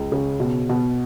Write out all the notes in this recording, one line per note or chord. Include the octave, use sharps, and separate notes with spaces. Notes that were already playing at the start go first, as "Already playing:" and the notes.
Already playing: C#2
C#3
B2
B2